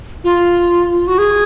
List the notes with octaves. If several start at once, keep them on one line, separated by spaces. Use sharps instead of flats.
F4
F#4
G#4